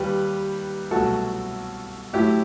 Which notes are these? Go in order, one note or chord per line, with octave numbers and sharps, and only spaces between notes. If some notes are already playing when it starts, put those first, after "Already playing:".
Already playing: D#2 D#3 G3 G4 B4
C2 B2 F#3 A3 F#4 A4
A2 F#3 A3 E4 G4